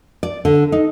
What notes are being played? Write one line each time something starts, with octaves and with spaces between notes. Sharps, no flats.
D5
D3
D#4